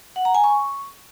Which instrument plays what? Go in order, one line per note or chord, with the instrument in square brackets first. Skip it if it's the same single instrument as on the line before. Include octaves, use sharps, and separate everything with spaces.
[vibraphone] F#5
A#5
G#5
C#6